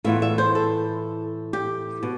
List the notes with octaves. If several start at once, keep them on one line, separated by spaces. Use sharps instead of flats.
A2 E3 B3 F4 E5
E5
C5
A4
G4
B2